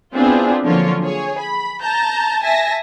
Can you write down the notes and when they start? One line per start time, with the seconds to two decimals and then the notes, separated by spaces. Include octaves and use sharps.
0.14 B3 C4 D4 E4 F4 G#4
0.66 D3 F3 F#3 A#3 F4 C#5
1.03 G#4 C#5
1.39 B5
1.83 A5 A#5 G6
2.43 E5 G#5 A5 A#6